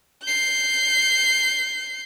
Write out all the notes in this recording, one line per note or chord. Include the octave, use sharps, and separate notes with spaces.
G6 C7